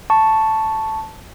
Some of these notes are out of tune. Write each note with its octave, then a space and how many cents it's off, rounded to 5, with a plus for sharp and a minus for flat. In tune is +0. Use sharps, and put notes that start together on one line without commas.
A5 +0 C#6 +0